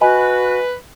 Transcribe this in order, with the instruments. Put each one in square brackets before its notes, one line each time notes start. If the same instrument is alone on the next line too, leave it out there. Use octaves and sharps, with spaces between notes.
[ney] F#4 [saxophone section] B4 [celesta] D#5 G#5 B5